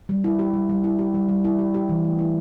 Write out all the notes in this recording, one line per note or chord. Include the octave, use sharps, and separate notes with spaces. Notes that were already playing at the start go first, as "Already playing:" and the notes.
G3
E4
G4
G3
G3
E4
G4
G3
G3
E4
G4
G4
E3
A3
E4